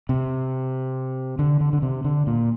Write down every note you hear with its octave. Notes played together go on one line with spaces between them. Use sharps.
C3
D3
D3
D3
C3
D3
A#2